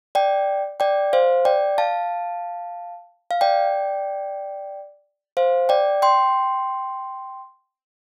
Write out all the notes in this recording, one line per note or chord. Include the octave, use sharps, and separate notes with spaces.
D5 G5
D5 G5
C5 F5
D5 G5
F5 A5
F5
D5 G5
C5 F5
D5 G5
G5 C6